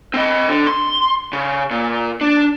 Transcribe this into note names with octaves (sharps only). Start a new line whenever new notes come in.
C4 D#5
D3
C6
C#3
A#2
D4